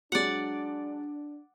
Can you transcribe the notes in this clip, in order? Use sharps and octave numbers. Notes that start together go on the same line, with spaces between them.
F#3 G#3 D4 D5 F#5